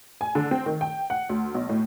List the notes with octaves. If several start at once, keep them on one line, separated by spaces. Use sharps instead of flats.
G#5
D3
C4
D#3
G5
F#5
D2
B1
A2